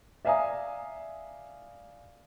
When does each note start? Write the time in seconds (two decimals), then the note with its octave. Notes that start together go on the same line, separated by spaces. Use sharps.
0.25 D5 E5 F5 G#5 A#5 D#6